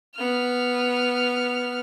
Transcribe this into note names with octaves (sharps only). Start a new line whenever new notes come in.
B3 F6